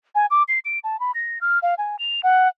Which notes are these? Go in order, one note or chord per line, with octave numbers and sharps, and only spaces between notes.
G#5
D6
C7
D7
A5
B5
A#6
F6
F5
G#5
F7
F#5